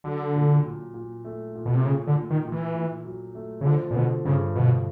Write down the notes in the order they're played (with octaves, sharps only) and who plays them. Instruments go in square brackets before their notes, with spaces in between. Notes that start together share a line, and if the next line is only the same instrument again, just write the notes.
[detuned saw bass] D3 [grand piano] F#3
[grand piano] A#2
A#2
A#2
A3
A#2
[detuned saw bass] B2
C3
[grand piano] A#2 [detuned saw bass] C#3
[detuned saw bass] D3
[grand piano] A#2
[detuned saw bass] D#3
[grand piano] A#2
[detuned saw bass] E3
[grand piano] A#2
F#3
A3
[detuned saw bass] C#3
[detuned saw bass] D3 [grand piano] F3
[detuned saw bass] A#2
[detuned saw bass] B2 [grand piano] D3
[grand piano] G2 [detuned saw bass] C#3
[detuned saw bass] B2 [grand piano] D3